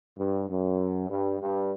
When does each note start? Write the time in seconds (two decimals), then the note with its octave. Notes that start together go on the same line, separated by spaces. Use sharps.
0.17 G2
0.48 F#2
1.09 G2
1.40 G2